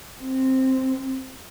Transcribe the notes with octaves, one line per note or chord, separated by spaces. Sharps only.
C4